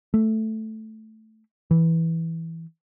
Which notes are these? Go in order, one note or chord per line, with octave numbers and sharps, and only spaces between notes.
A3
E3